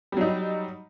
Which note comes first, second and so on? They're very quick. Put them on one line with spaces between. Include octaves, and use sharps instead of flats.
G3 F#3 D#4